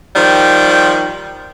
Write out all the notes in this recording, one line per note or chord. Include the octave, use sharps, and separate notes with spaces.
D#3 F3 G3